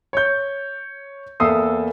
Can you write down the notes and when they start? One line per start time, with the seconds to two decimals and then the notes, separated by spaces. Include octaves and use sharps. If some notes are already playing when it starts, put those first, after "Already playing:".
0.13 C#5 G6
1.40 E2 A#3 A4 E5 D#6 C7